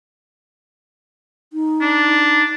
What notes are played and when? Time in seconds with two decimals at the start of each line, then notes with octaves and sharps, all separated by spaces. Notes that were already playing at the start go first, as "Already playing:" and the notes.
1.53 D#4
1.81 D4